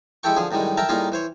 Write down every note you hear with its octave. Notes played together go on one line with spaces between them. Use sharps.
G#3 E4 G4 A4 G5 C#6
D3 F3 G#4
F#2 A2 D#3 G3 G#3
A#4 E5 G5 A5
A2 G3 A#3 D#4 F4 G#4
E3 C5 C#5